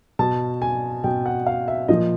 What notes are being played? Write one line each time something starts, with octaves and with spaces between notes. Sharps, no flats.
B2 A5
G#5
B2 G5
F#5
F5
E5
A#2 F3 D#5